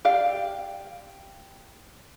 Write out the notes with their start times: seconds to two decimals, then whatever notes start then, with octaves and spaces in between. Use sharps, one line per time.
0.05 G4 D5 F5